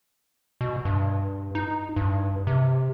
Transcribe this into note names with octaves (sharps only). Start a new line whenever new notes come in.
B2
G2
D#4
G2
C3